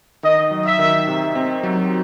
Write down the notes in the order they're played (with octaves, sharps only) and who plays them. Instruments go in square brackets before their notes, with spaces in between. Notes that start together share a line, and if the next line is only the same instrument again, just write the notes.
[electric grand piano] D#3 [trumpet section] D#5
[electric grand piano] F#3
[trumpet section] E5
[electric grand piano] D#3
C3
C4
F#3